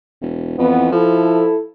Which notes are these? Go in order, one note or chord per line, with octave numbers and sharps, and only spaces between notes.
E1
F2 E3 B3
F3 E4 A4